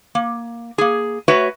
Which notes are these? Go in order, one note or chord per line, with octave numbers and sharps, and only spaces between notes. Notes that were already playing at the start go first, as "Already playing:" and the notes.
A#3
A#3 G#4
A3 F#4 B4 C#5 E5